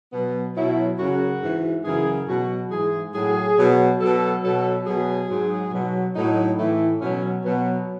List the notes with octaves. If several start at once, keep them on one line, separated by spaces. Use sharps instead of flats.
B2 F#3 B3
B2 F#3 E4
F#2 C#3 F#3 F#4
G#2 E3
F#2 C#3 E3 G#4
B2 F#3 F#4
G#2 E3 G#4
A2 F#3 G#4
B2 F#3
B2 F#3 A4
B2 F#3 A4
B2 F#3 G#4
G#2 F#3
B2 F#3
A2 F#3 D#4
A2 E3 A3
B2 F#3 C#4
B2 F#3 B3